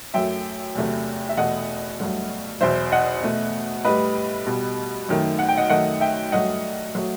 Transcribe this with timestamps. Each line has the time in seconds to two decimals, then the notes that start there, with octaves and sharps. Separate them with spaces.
0.14 F#2 F#3 A3 E5 G5
0.75 E2 C3 F#3 A3
1.29 E5
1.37 E2 B2 A3 D#5 F#5
2.00 G2 F#3 A3
2.61 E2 B2 F#3 C5 E5
2.92 D#5 F#5
3.23 B2 A3
3.85 A2 G3 B4 D#5
4.46 B2 G3
5.09 F#2 D#3 A3
5.39 F#5
5.48 G5
5.57 D#5 F#5
5.70 F#2 D#3 A3 D#5 F#5
6.01 E5 G5
6.32 G2 F#3 A3 D#5 F#5
6.95 F#3 A3